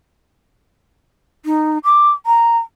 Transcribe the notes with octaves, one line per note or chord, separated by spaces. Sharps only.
D#4
D6
A#5